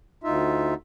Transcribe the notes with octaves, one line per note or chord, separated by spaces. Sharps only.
D2 D#4 F4 E5